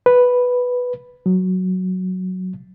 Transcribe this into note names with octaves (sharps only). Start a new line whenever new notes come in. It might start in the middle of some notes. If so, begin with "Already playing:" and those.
B4
F#3